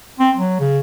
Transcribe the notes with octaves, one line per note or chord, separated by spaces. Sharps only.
C4
F#3
C#3